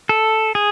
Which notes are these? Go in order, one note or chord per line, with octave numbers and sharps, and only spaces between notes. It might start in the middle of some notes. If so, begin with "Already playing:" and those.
A4
G#4